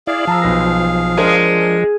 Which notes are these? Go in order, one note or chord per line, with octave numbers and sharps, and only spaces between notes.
E4 G#4 D5 F5
F3 A5 A#5 E6
B1 B4 A#6
G#3 D4 A#4 C5